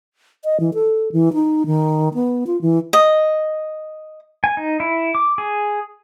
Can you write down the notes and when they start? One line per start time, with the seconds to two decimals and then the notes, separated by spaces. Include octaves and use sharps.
0.44 D#5
0.60 E3
0.74 A4
1.12 E3
1.33 D#4
1.66 D#3
2.14 B3
2.47 F4
2.62 E3
2.93 D#5
4.44 G#5
4.57 D#4
4.80 E4
5.15 D6
5.38 G#4